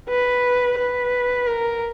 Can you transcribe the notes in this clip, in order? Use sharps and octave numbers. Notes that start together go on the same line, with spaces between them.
B4
B4
A#4